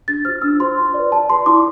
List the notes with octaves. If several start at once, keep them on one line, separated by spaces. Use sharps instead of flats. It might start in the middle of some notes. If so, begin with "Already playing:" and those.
D4 A6
F4 C5 F6
D4 E6
F4 C5 C6
F4
B4 D5
F4 A5
B4 D5 C6
E4 D6